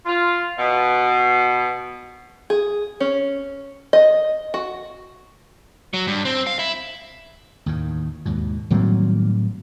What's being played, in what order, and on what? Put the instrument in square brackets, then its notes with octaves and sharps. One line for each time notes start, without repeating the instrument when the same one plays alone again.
[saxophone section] F4
B2
[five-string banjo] G#4
C#4
D#5
F#4
[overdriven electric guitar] F#3
G2
C4
F5
E4
[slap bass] D#2 A2 D#3
D#2 G#2 B2
[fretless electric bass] A2 F#3 C4 [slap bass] D#3 G3 A#3